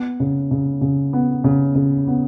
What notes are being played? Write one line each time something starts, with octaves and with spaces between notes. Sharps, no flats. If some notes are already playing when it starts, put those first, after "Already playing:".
Already playing: B3
C#3
C#3
C#3
B3
C#3
C#3
B3